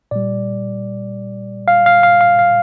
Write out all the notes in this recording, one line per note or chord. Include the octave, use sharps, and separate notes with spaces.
A#2 G3 D5
F5
F5
F5
F5
F5